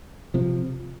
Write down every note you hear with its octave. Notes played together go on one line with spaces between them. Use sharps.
C3 F3